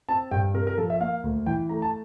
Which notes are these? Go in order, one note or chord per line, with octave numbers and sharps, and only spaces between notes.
C4 A5
G2 G5
C3 A#4
A#4
F3 A4
E5
A#3 F5
D2
E3 G5
A3 A#5
A5